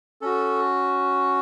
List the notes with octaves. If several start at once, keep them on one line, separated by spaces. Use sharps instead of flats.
C#4 F#4 A4